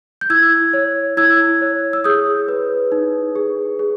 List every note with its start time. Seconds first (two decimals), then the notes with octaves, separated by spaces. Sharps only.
0.21 G6
0.30 E4 E6 G#6
0.73 C#5
1.17 E4 E6 G#6
1.62 C#5
1.93 E6
2.04 G#4 D#6 G6
2.48 B4
2.92 D#4
3.36 G#4
3.79 G#4